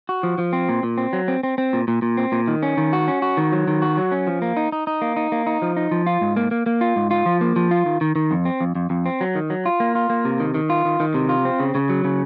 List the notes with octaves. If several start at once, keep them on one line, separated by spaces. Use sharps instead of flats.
F#4
F3
F3
C4
A#2
A#2
C4
F#3
C4
C4
C4
A#2
A#2
A#2
C4
A#2
D#3
C#4
D#3
F#4
C#4
F#4
D#3
F#3
D#3
F#4
F#3
C#4
F3
A#3
D#4
D#4
D#4
A#3
D#4
A#3
D#4
F3
D#4
F3
F4
G#2
A#3
A#3
A#3
F4
G#2
F4
F3
A#3
F3
F4
D#3
D#3
D#3
F2
C4
F2
F2
F2
C4
F#3
D#3
F#3
F4
A#3
F4
A#3
C3
D#3
D#3
F4
D#3
D#3
C3
F4
C4
C#3
C#3
F#3
C#3